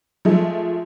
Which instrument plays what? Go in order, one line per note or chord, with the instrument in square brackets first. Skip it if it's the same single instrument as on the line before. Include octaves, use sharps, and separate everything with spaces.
[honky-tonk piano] F3 G#3 A3